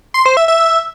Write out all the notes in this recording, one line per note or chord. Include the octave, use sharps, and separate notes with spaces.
C6
C5
E5
E5